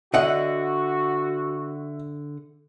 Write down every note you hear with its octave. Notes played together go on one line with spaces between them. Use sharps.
D3 F#4 D#5 E5 F#5